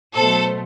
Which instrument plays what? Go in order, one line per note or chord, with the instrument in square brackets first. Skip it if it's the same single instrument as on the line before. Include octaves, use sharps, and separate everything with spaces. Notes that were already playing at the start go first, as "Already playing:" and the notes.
[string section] B2 F#3 A3 A4 C5